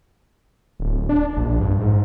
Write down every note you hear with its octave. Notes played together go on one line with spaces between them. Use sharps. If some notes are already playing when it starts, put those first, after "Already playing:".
D1
D4
A#1
G2
G#2